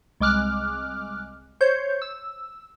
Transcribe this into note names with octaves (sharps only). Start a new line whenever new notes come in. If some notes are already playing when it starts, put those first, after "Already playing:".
C2 G#3 D6 F6 F#6
C5 C#5 G6
E6